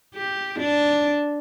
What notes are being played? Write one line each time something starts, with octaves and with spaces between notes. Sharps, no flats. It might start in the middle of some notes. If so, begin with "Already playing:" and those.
G4
D4